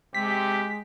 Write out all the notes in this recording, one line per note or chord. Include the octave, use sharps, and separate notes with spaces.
C3 G#3 G4 B6